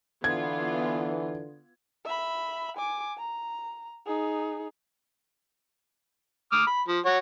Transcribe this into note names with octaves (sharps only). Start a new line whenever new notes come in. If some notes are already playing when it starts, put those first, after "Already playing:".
D3 E3 B3 F4 G#6
E5 B5
G#5 D6
A#5
D#4 G#4
D6 D#6 F6
B5
F3
F#4 C#5